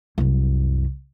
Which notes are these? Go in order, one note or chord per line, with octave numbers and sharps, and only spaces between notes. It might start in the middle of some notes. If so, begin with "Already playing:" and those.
C2 F#2